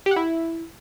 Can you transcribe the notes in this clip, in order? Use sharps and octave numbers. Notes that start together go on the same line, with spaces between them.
G4
F#5
E4